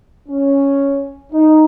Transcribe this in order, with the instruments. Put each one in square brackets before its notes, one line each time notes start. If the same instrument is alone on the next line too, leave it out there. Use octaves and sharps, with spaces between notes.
[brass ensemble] C#4
D#4